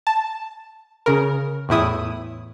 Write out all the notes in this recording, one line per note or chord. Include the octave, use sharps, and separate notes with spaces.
A5
C#3 A#4
E2 A2 E4 D#6